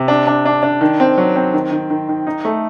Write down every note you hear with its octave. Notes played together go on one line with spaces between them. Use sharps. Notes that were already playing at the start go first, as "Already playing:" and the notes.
Already playing: C3
D4
D4
D4
D4
D#3
C4
F#3
C4
D#3
D#3
D#3
D#3
D#4
A3